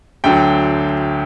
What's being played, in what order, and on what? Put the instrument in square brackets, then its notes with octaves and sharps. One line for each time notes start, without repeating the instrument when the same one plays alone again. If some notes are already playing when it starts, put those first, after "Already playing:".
[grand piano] D2 D3 F#3 G5